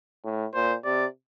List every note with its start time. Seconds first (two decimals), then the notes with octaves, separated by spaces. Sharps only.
0.24 A2
0.54 A#2 C5
0.85 C3 D5